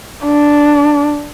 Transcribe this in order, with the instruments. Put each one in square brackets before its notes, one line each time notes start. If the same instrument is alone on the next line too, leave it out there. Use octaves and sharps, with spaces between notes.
[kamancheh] D4